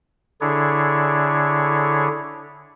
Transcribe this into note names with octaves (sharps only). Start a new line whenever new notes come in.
D3 D4 E4 G#4 C#5